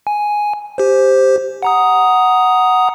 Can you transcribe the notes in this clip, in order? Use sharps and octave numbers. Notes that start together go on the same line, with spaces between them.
G#5
G4 C5
F#5 A#5 D#6